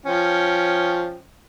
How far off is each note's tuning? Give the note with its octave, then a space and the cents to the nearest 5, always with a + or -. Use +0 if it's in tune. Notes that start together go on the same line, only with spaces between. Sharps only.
F3 +0 C#4 +0 G5 +0